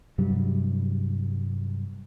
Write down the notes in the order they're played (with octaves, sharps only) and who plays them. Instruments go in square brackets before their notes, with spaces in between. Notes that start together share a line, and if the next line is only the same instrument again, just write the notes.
[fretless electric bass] G2 C3 F#3 G3